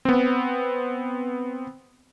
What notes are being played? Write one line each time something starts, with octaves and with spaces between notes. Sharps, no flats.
B3 C4